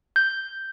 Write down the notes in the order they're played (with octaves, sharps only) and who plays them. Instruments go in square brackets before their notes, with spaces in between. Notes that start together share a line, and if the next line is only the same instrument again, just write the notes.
[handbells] G6